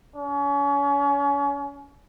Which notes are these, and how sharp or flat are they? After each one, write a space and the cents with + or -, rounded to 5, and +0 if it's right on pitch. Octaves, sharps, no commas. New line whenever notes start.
C#4 +35